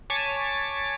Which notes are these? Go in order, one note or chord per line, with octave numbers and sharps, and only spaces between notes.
C#5 G#5 A5 D6 A6 B6